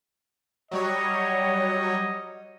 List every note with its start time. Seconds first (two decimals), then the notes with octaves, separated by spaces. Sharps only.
0.71 F#3 G3 C#5 D#5